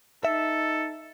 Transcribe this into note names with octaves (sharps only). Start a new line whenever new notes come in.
D#4 A4 E5